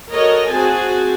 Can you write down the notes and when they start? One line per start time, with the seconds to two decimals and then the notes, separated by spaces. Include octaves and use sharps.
0.12 F#4 A4 A#4 C#5 D#5
0.49 C4 F#4 G#4 G#5 A5